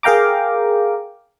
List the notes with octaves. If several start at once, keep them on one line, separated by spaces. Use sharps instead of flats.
G#4 A#4 F5 G5 A#5 D6